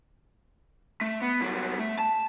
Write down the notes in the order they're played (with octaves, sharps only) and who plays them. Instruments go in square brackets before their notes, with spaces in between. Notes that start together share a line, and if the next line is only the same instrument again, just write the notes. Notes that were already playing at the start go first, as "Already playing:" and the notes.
[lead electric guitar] A3
B3
C2 F#3
A3
A5